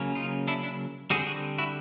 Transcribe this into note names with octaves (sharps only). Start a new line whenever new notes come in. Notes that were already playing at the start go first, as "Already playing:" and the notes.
Already playing: C#3 F#3 A#3 C#4
D#4 F4
D4 E4
D4 E4
D3 G3 C4 F#4 G#4
F#4 G#4
E4 F#4